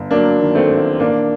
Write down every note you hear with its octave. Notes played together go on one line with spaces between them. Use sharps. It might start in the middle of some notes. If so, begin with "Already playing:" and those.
Already playing: G1
F#3 A#3 D4
D#3
A3 C4
A1
A#1 A#3 D4